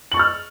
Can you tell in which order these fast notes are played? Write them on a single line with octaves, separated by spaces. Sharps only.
F#7 C#6 A6 F6 E6